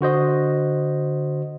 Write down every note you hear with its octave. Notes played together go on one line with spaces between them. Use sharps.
D3 F#4 C5 D#5